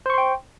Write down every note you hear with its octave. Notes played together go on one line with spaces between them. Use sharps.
C5 G5 C6 C#6